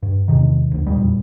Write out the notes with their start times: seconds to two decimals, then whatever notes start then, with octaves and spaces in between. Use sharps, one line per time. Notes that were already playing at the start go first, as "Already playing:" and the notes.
0.03 G2
0.28 E2 C3 D#3
0.71 F1 D2
0.87 E1 F2 A#2 G3